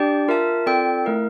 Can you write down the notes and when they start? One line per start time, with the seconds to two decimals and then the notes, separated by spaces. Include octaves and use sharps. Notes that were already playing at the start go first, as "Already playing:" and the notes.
Already playing: D4 G4 D5 G5
0.28 F4 A#4 E5 A5
0.66 C4 F4 A4 D5 G5
1.05 A3 E4 A#4 F5